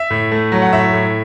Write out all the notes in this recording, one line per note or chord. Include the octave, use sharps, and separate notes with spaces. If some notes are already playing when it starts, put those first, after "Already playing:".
Already playing: E5
A2
A3
F#3
F#5
A2 E5
A2